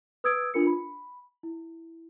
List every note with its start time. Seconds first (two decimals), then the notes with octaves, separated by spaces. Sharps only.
0.24 B4 D#6 E6 G#6 D7
0.54 D4 F4 A#4 C#7
0.67 B5
1.43 E4